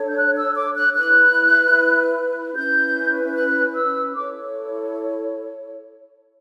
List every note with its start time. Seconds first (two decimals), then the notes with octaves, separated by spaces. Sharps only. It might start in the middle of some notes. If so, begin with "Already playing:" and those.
Already playing: D4 A4 C#5
0.09 G6
0.16 F#6
0.37 E6
0.56 D6
0.76 F#6
0.96 E4 B4 F#6
2.55 C#4 E4 B4 G6
3.36 F#6
3.75 E6
4.15 E4 A4 C#5 D6